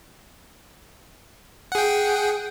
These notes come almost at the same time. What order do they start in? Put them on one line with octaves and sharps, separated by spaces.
F#5 G#4 G5